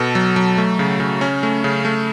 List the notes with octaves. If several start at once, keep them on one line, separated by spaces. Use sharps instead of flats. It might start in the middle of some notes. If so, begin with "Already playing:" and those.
Already playing: B2 A4
F#3
F#3
A3
C#3
C#3
C#4
A3
C#3
A3